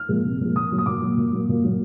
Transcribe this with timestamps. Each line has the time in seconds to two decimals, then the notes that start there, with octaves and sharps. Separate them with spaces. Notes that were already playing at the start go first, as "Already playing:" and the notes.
Already playing: F6
0.09 A#2 F3 G#3
0.24 C2
0.40 A#2 F3 G#3
0.55 A#2 D#6
0.70 F#3 A#3
0.78 D#6
0.86 A#2 D6
1.02 F#3 A#3
1.17 A#2
1.32 F#3 A#3
1.49 A#2
1.64 F#3 A#3